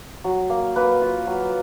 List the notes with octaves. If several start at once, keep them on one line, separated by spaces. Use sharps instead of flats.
F#3
A#3
A#3 B4
F4
F#3